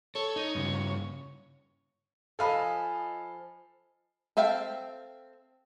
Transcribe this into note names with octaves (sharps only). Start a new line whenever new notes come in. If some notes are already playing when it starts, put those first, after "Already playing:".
A4 C#5
D#4
G2 C#3
F3 A4 D#5 F5 G#5 B5
C4 A4 E5 F5 G5